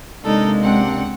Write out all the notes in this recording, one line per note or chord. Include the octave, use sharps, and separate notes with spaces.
C3 G#3 A#3 D4 D#4 A4
C#2 C4 F#5